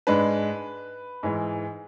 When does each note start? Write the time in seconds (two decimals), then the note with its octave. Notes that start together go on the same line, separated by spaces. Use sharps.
0.07 G#2 G#3 D4 B4
1.23 G#2 E3 G#3